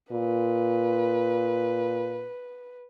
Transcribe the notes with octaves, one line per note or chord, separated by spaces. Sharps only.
A#2 B4